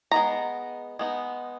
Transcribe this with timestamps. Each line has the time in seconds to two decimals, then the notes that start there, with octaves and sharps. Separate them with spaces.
0.11 G#3 B3 D#4 A#5
0.99 G#3 B3 D#4